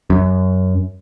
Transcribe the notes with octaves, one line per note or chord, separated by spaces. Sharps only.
F#2